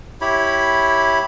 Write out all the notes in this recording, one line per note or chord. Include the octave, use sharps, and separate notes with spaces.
E4 G4 C#5 B5